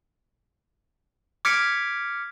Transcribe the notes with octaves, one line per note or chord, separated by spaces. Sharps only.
D6 F6 G#6 B6 C#7 D7